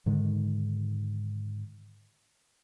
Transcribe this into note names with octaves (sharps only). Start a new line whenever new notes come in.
G#2 D3 D#3 G#3